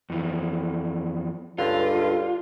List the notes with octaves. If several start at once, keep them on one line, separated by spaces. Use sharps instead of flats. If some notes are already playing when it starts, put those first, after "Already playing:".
F2 E3
C#2 G2 D3 F4